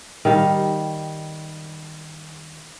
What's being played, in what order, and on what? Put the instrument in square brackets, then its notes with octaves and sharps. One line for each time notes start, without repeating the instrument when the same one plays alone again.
[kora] D#3 G3 F5